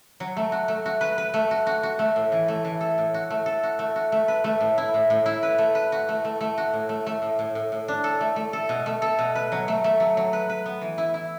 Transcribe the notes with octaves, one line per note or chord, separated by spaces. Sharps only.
F#3
A3
F#4
A3
F#4
B4
B4
A3
F#4
F#4
F#4
A3
A2
E3
A3
E3
A4
A2
F#4
A3
A4
F#4
A3
F#4
A3
B4
A3
A2
E4
A2
A2
E4
B4
A3
B4
F#4
A3
A3
A3
F#4
A2
A3
A3
A2
A2
A2
A2
D4
A4
A3
A3
A4
B2
A3
A4
B2
B4
F#3
A3
A3
F#3
F#3
B4
B4
B3
E3
E4
E4